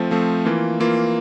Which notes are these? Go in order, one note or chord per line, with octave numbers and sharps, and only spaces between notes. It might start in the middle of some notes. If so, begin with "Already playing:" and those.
Already playing: F3 A3 C4
F3 A3 C4
E3 A#3 F4
E3 A#3 F4